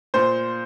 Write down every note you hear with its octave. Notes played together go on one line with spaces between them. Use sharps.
A#2 C5